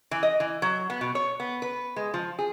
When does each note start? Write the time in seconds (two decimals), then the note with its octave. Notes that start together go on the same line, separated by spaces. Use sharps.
0.11 E3
0.23 D#5
0.40 E3
0.62 F#3
0.90 B3
1.01 B2
1.15 C#5
1.40 B3
1.62 B4
1.96 G#3
2.14 F3
2.39 G#4